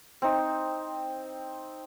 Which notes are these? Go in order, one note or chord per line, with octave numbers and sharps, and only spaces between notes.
C4 D#4